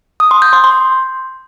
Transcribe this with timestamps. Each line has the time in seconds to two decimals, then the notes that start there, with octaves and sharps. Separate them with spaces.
0.20 D#6
0.31 C6
0.42 G6
0.53 C6
0.64 C6